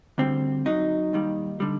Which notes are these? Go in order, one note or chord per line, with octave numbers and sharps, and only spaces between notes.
D2 D3 G3 C4
F#2 F#3 D#4
D#2 D#3 G3
D3 G3